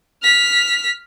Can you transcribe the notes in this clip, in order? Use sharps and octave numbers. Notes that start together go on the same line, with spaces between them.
F6 B6